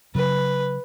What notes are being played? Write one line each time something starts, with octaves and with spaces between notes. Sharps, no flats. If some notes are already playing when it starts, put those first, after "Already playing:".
C#3 F#3 B4